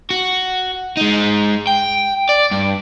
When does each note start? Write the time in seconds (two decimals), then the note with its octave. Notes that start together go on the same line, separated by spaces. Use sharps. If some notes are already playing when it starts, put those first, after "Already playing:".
0.11 F#4
0.97 G#3 D#4
1.67 G5
2.29 D5
2.51 G2